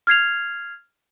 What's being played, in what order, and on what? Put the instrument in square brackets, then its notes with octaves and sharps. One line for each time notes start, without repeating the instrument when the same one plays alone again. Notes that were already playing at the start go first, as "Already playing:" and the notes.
[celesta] F6 G#6 C7 F7